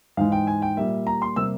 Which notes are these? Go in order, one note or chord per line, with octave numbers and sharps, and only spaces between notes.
G#2 E3 G#3 F5
G5
G#5
G5
A#2 G3 A#3 E5
A#5
C6
C3 G3 A#3 E6